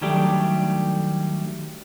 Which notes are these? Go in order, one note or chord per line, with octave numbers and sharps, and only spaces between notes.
D#3 F#3 G3 A3 D4 G4